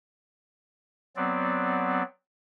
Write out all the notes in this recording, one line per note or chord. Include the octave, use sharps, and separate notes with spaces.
F#3 B3 C4 D5